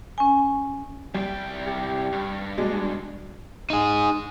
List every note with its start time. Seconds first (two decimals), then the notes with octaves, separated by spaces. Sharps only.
0.18 C#4 G#5
1.14 C2 G3 G5
1.66 G4
2.12 G2
2.58 B2 G#3 D4
3.70 D#4 G#4